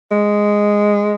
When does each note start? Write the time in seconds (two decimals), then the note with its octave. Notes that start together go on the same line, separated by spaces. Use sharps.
0.11 G#3